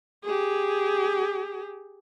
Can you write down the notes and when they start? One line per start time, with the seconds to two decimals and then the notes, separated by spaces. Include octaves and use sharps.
0.24 G4 G#4